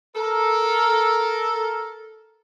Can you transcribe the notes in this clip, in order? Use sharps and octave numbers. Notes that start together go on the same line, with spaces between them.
A4 A#4